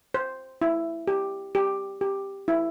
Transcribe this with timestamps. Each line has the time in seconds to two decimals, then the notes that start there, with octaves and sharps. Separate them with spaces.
0.14 C5
0.61 E4
1.07 G4
1.55 G4
2.01 G4
2.48 E4